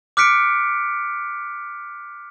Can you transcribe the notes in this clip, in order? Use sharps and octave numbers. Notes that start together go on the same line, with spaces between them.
D6 F6 F#6 B6 C#7 D7